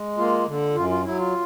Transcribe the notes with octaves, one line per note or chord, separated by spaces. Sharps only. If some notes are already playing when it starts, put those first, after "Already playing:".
Already playing: G#3
A#3 F4
D3
F#2 F4
F4
F#3 E4
F4